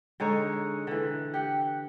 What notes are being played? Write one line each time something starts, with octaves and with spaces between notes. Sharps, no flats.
D3 G#3 D#4 C#5
D3 E3
G4 F#5